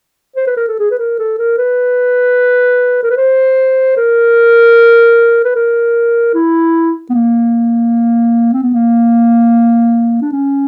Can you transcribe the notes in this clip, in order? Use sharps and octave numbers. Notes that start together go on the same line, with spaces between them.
C5
B4
A#4
A4
G#4
B4
A#4
A4
A#4
B4
A#4
B4
C5
A#4
B4
A#4
E4
B3
A#3
C4
B3
A#3
D4
C#4